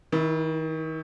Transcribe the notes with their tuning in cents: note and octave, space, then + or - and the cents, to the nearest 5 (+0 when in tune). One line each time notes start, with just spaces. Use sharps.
D#3 +35 E4 +0